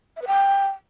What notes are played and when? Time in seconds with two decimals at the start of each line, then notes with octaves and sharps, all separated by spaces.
0.16 E5
0.22 B4
0.27 G5